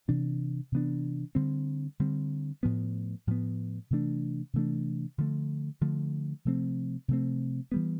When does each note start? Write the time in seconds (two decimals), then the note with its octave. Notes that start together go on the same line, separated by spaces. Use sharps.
0.08 C3 E3 B3 D4
0.72 C3 E3 B3 D4
1.35 D3 G3 C4
2.00 D3 G3 C4
2.63 A2 F3 B3
3.27 A2 F3 B3
3.90 C3 E3 A3 D4
4.53 C3 E3 A3 D4
5.18 D3 F3 A3
5.81 D3 F3 A3
6.45 C3 F3 A3 C4
7.08 C3 F3 A3 C4
7.72 E3 G3 B3